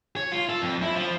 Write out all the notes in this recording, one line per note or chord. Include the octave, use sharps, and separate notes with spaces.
C#5
F4
A4
F2
E4
F3